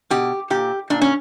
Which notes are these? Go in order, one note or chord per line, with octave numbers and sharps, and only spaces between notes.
B2 G4
A#2 G4
A#2 D4
C#4